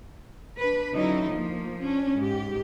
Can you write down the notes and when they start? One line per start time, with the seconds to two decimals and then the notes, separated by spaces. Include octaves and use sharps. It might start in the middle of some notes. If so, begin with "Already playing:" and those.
0.60 D4 B4
0.95 D3 F#3 C#4 D#4 E4
1.30 F3 A#3
1.82 C#4 D4
2.16 G#2 G4